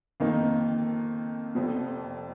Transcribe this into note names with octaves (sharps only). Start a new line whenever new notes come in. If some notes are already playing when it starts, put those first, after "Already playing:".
F2 D#3 A#3 D#4
F1 F2 F3